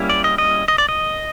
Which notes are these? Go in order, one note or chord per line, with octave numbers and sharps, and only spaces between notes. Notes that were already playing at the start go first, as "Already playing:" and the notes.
Already playing: G3 A#3 C#4 E4
D5
D#5
D#5
D#5
D5
D#5